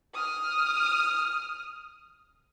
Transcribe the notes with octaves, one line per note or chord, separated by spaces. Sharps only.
D#6 F6